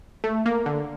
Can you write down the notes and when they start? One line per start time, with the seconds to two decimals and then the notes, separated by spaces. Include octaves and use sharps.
0.24 A3
0.46 A#3
0.66 D3